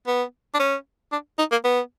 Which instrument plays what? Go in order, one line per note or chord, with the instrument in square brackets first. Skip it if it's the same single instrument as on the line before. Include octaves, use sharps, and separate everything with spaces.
[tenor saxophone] B3
D4
C#4
D4
D#4
A#3
B3